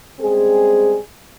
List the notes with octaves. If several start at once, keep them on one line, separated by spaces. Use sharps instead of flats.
G3 G#3 C4 C#4 G#4